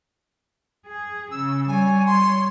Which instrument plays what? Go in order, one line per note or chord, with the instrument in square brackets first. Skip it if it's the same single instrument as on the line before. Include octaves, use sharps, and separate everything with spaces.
[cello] G#4
[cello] C#3 [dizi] E6
[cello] G3 C#5 [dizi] G#5
[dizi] C6